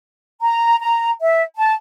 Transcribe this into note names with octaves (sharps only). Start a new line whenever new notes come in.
A#5
A#5
E5
A5